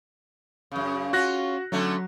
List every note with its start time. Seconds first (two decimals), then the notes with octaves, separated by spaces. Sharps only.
0.72 F#2 C#3
1.13 C#4 F4 F#4 F#6 A#6
1.72 D3 F#3 A3 C#4